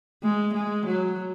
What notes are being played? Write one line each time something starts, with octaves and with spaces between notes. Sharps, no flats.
G#3
G#3
F#3